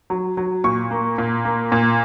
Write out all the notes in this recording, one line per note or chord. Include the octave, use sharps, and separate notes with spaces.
F#3
F#3
A#2 C#6
A#3
A#2
A#3
A#2